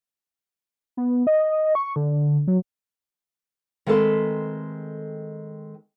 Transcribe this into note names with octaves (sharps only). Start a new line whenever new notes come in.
B3
D#5
C#6
D3
F#3
D#3 G#3 A3 C4 A4 B4